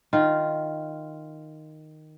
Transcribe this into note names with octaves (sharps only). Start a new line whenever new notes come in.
D#3 F4